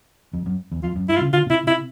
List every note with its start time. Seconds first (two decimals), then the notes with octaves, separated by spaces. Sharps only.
0.33 F2
0.46 F#2
0.72 E2
0.83 F2 F4
0.96 F#2
1.09 G2 E4
1.16 F4
1.21 C#3
1.33 D3 F4
1.46 B2
1.50 C3 E4
1.67 C3 E4